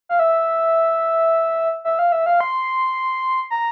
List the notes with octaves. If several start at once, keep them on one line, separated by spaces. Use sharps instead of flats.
F5
E5
E5
F5
E5
F5
C6
A#5